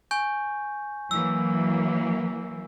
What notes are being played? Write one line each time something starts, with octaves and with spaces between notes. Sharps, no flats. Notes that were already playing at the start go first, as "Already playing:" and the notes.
G#5 C#6 G6
E3 F#3 A#3 E6